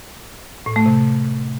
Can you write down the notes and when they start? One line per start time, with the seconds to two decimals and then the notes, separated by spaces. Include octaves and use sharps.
0.66 A2
0.76 A3
0.86 C3